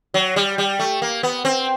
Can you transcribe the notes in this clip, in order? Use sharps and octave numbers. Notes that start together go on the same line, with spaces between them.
F#3
G3
G3
A3
A#3
B3
C4